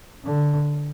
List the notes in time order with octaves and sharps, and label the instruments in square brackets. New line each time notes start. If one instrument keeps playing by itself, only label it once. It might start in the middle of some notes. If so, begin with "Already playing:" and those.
[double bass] D3